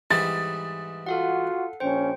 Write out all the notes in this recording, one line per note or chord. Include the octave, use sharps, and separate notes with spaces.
G#2 E3 G3 D#6 A6
F4 F#4 A4 F5 F#5
A#1 C#4 C5 G5